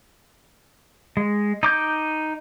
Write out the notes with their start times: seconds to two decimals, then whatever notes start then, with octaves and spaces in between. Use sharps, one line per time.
1.17 G#3
1.63 D#4 D6 G6